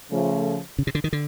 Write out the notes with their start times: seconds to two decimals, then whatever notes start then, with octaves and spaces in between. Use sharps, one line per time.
0.10 C#3 F3 A3
0.79 C#3
0.87 C3
0.95 D3
1.04 D#3
1.13 D3